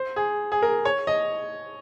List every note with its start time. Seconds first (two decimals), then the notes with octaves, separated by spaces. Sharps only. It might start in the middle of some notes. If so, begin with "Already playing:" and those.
Already playing: C5
0.16 G#4
0.52 G#4
0.62 A#4
0.85 C#5
1.07 D#5